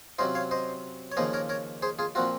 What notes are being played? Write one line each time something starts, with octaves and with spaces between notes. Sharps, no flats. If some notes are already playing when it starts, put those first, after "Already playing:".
C3 F#3 C#4 F4 C5 D#5
C#5 F5
C5 D#5
C#5
D#2 C#3 F3 A#3 C#4 C5 D#5
A#4 C#5
A#4 C#5
G#4 C5
F4 G#4
A#2 F3 C4 F4 F#4